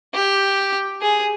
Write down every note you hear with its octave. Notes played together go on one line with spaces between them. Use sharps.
G4
G#4